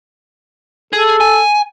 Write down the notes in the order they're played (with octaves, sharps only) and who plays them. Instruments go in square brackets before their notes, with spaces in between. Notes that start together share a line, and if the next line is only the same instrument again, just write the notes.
[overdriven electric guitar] G#4 [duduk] A4
[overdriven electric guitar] G#5